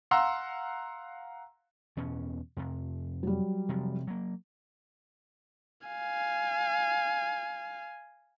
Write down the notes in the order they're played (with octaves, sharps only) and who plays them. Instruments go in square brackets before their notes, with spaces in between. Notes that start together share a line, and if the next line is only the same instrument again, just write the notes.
[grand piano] F5 F#5 A#5 C6 E6
[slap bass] E2 B2 C#4
F2 C3
[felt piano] F#3 G3
[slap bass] C3 F3
F#3 A#3
[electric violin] F5 G#5